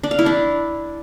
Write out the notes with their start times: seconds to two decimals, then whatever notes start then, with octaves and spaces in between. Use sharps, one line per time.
0.03 D4
0.11 F5
0.19 E4
0.26 D4